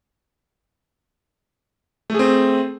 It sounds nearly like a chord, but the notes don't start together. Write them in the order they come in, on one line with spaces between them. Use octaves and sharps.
A3 G#4 C4